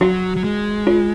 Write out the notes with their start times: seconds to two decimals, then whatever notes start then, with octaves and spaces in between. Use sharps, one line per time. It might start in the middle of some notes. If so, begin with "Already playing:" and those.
0.01 F#3 F#4
0.36 F#3
0.44 G#3
0.87 F4